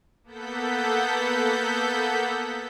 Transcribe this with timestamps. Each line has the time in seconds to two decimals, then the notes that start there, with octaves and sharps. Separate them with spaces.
0.24 A#3 B3 A4 F#5 G6 B6